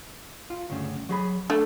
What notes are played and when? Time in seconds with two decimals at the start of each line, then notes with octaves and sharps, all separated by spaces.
0.50 F4
0.70 D2 G2 C#3
1.09 F#3 G#4 B5
1.50 A3 D4